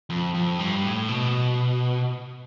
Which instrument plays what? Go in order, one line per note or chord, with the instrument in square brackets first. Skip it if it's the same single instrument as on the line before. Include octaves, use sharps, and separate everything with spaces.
[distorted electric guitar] F2
F2
G2
A2
B2